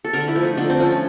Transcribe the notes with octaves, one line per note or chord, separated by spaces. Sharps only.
A4
D3 A#4
E4
F3 A3
D#4
D3 D4
C4
F3 A3 C#4